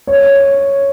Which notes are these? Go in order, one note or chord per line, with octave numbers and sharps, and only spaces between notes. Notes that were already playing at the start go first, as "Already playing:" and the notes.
C#5